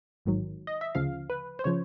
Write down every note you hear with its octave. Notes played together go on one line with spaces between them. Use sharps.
A1 G#2 D#3 F#3
D#5
E5
D2 C#3 F3 F5
B4
C5
C#3 F3 C#5